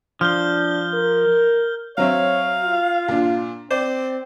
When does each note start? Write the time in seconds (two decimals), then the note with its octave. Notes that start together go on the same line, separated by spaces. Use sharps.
0.21 F3 D4 F6 G6 G7
0.94 A#4
1.98 F#3 C4 C#5 E5 F5
2.63 F4
3.08 A#2 D4
3.71 C4 C5 D5